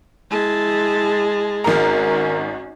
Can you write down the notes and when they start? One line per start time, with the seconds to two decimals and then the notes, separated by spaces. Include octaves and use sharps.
0.30 G#3 E4 A5
1.64 G#1 C#4 F#4 A#4 A#5